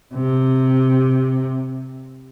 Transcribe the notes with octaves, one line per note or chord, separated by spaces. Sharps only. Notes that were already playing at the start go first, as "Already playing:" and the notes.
C3